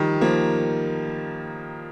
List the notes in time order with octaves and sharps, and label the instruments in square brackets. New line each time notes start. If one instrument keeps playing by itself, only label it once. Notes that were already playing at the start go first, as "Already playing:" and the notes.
Already playing: [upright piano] D#3 F3 G3
F3 A#3